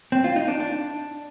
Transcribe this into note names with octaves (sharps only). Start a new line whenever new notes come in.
C4
F4
D#4
D4
D4